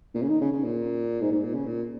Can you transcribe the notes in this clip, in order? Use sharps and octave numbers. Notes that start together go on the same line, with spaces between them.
A#2
C#3
D#3
C#3
C#3
A#2
G#2
G#2
A#2
C#3
A#2